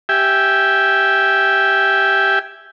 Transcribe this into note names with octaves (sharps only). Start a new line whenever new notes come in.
G4 E5 G5 G#5